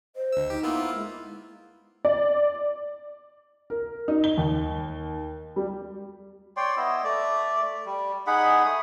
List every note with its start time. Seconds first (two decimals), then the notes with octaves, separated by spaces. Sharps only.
0.16 C5 D#5
0.33 D2 E6
0.50 D#4 G4
0.63 A#3 B3 E4 F4 E6
0.93 G#3
2.05 D5
3.70 A#4
4.08 D#4
4.24 G7
4.37 D#2
5.56 G3
6.57 C#5 D5 G5 C6
6.77 B3 E4 D#5 E6
7.04 A3 D5
7.86 G3
8.27 D#4 G#4 F#5 B5
8.65 A3 D#6